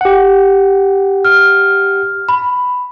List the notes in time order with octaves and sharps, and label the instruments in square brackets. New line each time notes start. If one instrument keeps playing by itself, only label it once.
[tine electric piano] G4 F#5
[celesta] F6
B5